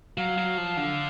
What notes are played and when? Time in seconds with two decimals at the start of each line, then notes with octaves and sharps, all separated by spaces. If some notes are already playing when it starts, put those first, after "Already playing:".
0.18 F#3 F5
0.38 F#3
0.58 F3
0.77 D3